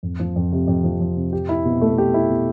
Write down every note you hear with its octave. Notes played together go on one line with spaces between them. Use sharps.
F2
F3
F2
C3
F2
F3
F2
C3
G4
E4
B2
A3
G4
E4
B2